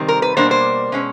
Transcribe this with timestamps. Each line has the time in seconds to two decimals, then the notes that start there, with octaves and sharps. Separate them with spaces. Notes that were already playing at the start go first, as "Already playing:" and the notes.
Already playing: C3 D#3 G3 C4
0.08 A#4
0.22 B4
0.37 B2 G3 A#3 D4 C5
0.51 C5
0.92 B2 G#3 C#4